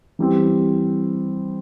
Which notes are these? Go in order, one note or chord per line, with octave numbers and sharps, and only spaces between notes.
E3 G3 C4